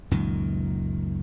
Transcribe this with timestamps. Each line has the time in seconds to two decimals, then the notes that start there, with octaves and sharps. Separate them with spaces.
0.11 C#2 F#2 A#2 D#3